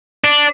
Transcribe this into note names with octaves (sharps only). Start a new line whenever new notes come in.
D4